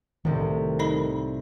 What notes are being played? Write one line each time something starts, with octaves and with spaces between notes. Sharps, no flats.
C2 A2 D#3
D#4 D#5 B5